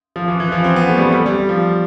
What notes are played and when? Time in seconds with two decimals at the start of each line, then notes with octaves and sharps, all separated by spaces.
0.16 F3
0.28 E3
0.40 E3
0.52 F3
0.64 C4
0.76 B3
0.89 A3
0.97 G3
1.01 A3
1.13 G3
1.26 G3
1.49 F3